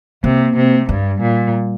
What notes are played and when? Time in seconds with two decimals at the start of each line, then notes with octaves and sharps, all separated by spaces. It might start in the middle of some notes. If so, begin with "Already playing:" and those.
0.24 C3 A#3
0.57 C3
0.89 G2 G3
1.22 A#2